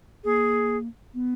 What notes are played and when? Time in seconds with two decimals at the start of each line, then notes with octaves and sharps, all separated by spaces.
0.24 A#3 G#4
1.14 B3